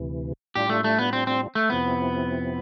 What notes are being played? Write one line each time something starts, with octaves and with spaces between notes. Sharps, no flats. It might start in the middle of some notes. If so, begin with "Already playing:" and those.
Already playing: D2 C3 E3
A2 G3 D4 F4 G4
A3
A3
B3
C4
C4
A3
F2 C3 F3 B3 C4 E4